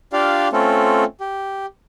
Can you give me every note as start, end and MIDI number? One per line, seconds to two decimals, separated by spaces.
0.13 0.48 62
0.13 0.48 65
0.13 0.48 67
0.13 0.48 74
0.13 0.48 77
0.52 1.04 57
0.52 1.04 60
0.52 1.04 61
0.52 1.04 65
0.52 1.04 69
1.21 1.66 67